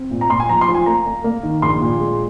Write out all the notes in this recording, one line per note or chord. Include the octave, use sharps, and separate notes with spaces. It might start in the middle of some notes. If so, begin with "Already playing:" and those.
Already playing: C4
A#2
A#5
A#2 C6
G#5
F3 A#5
C6
F3
G#5
A#3 A#5
A#3
A#3
D#3
A#1 C6
A#2
G#3